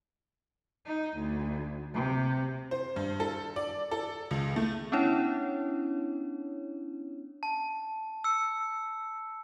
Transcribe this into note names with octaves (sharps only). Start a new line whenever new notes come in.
D#4
D2
C3
C5
G2
A4
D5
A4
C#2
A3
B3 C#4 D4 E4 C#5
A5
E6 C#7